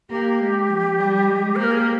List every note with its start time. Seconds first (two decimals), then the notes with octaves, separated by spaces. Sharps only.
0.10 A#3 G4
0.40 G#3
0.69 F3
0.99 G3
1.27 G#3
1.56 A#3 C5
1.64 A#4
1.72 G#4
1.80 G4